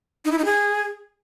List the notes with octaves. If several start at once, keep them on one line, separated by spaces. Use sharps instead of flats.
D#4
E4
D#4
G#4